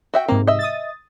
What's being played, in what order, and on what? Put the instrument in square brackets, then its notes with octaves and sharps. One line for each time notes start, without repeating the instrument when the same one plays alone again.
[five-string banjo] F#4 E5 G5
[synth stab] G#2 C3 [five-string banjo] A#3
[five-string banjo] D#5 E5
[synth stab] D#6 A6